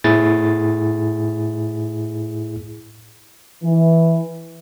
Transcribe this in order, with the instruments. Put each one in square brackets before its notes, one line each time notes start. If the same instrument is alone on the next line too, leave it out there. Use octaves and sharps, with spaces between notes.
[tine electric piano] A2 E4 G#4 A6
[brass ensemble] E3